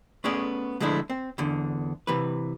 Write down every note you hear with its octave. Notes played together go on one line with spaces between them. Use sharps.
A3 B3 C#4 G#4 D5
D3 F3 G#3 A3 D4 E4
C4
E2 D3
C3 E3 B4